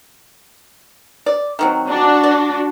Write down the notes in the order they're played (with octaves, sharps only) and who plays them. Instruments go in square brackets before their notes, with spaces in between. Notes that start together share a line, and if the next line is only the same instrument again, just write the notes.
[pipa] D5
D#3 F#3 C4
[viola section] D4 F#4
[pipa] D5